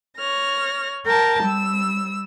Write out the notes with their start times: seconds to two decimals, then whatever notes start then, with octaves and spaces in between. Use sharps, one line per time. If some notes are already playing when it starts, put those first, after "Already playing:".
0.18 C#5 F6 A#6
1.06 A#4 G5 A5 A#5
1.43 G3 E6